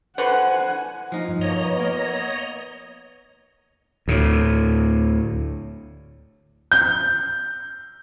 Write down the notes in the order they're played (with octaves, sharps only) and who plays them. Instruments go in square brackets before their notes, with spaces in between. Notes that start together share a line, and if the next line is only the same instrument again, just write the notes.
[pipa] D3 F#4 B4 [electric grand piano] C5 [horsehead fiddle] F#5 G#5
[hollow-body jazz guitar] F3 D#4
[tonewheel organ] G2
[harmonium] B2 A#3 [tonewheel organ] C#5 D#5 A#5
[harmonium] B3
[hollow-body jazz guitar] A#3
[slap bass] D2 A2
[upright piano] G6